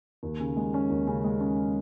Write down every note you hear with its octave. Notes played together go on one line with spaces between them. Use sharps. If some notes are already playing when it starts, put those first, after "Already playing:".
D#2
C#3
G#3
C#4
D#2
C#3
G#3
C#4